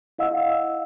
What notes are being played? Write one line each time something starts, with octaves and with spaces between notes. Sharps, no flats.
E4 D#5 F5 F#5 E6